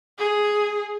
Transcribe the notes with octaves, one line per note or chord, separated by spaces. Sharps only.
G#4